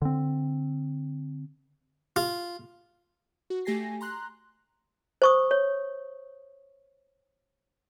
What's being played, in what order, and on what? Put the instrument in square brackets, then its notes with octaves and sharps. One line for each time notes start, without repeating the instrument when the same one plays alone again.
[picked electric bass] D3 C4
[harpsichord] F4
[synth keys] F#4
A3 G4 G#5 A#6 C7
A#5 C6 F#6
[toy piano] C5 C#6 D#6
C#5